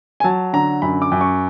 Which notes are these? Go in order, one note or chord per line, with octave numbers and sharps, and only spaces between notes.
G#5
F#3 A5
D3 A#5
F#2 B5
D6
F#2
C#6